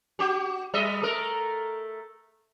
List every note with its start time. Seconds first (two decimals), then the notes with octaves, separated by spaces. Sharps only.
0.19 F#4 G4
0.74 G3 D#5 E5
1.02 A3 A#4